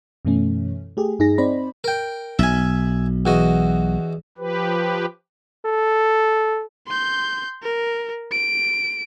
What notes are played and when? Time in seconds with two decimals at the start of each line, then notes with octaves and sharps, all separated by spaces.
0.25 F#2 B2 E3 A3 C#4
0.97 A3 G4 G#4
1.19 G2 D#4 G#4 A#6
1.38 C4 D#4 C5 D5 B5
1.84 A#4 G5
2.39 B1 E5 G#5
3.26 E2 F#4 D#5
4.38 F3 G4 B4
5.65 A4
6.88 C6 G6
7.63 A#4
8.32 D7